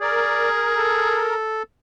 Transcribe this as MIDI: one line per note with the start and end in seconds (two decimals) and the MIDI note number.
0.01 1.29 68
0.01 1.35 70
0.01 0.49 74
0.77 1.63 69